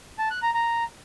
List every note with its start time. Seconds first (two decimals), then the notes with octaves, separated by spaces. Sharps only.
0.19 A5
0.30 F#6
0.42 A#5
0.54 A#5